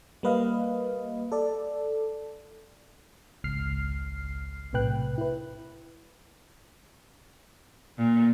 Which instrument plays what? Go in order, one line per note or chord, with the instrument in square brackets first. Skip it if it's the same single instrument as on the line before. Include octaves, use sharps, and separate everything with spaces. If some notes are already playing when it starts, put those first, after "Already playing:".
[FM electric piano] G3 A#3 B4 D#5 F5
A4 D5
G#1 C#2 F6 C7
B1 A2 C3 B4 G5 F#6
E4 B4
[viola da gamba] A#2